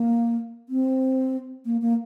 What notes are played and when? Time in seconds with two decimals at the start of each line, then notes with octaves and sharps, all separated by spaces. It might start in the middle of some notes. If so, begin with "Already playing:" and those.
Already playing: A#3
0.69 C4
1.66 A#3
1.82 A#3